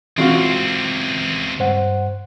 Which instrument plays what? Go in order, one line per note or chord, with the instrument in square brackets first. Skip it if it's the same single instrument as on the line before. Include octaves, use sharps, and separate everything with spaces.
[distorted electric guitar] C#2 C4 [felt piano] C3 F4 F#4 [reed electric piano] E3 G#3 F6
[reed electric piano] G2 C5 F#5